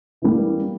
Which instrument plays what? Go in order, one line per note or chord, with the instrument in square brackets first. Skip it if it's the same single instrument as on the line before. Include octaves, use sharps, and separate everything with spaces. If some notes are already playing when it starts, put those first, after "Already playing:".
[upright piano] E3 G3 A#3